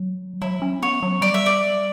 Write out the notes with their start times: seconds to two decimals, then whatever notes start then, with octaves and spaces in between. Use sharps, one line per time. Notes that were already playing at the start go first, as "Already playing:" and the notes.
Already playing: F#3
0.42 F#3 E4
0.62 C#4
0.83 B3 C#5
1.03 F#3
1.21 G3 D5
1.34 E5
1.46 D5